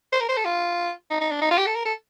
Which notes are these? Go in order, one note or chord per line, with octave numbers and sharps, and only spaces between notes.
C5
A#4
C5
A4
F4
D#4
D#4
D4
D#4
F4
G4
A4
A#4
A4